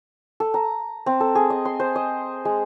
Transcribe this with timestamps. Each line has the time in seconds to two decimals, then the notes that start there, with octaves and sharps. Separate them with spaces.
0.40 A4
0.54 A#5
1.06 C4
1.20 A4
1.35 G#4
1.50 D#5
1.65 C6
1.80 C5
1.96 D#5
2.45 G#3